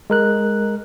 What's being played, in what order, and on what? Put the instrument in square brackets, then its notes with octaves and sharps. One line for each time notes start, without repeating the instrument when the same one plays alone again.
[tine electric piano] G#3 A#4 F#6